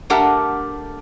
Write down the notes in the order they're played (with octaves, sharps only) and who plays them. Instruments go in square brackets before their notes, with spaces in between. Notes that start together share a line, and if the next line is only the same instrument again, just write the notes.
[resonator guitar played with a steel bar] A3 D4 G4 A#4 F#5 A5